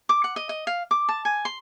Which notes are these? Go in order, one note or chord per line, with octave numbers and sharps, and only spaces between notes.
D6
F#5
D#5
D#5
F5
D6
A5
G#5
C6